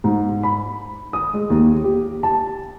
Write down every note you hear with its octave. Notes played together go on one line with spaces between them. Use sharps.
G#2
B5
D#6
G#3
D#2
G4
A5